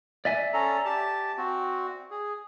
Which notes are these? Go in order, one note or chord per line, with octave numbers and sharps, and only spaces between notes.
D5 E5 G#5
C#4 A4 A#5
G4 A5
C4 F#4
G#4